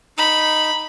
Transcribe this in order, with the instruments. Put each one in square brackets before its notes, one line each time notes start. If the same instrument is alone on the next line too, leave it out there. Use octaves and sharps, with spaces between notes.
[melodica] D#4 [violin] B5